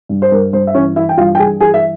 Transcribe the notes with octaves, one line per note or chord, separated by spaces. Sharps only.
G2
C5
G2 A#4
G2 C5
E5
E3 C#4 C#5
E3 E4 E5
G5
G2 F4 F5
G5
G2 G#4 G#5
E3 G#4 G#5
E5